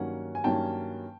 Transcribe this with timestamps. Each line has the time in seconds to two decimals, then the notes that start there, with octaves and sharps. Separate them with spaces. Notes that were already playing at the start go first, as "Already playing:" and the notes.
Already playing: G2 D#3 F#3 A#3 C#4 F#5
0.35 G#5
0.44 G2 D#3 F#3 A#3 C#4 G5 A5